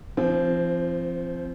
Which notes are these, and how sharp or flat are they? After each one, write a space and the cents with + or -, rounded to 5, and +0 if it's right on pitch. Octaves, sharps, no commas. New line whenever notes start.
F3 -30 C4 +0